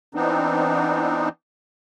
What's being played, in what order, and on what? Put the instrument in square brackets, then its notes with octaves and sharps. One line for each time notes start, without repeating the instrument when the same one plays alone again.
[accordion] E3 B3 C4 D4 D#4